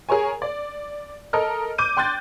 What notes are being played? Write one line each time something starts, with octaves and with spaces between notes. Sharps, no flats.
G#4 A#4 C#5 G#5
D5
A4 A#4 D#5 F6
D6 G6 D#7
G5 C6 F#6 G6 A6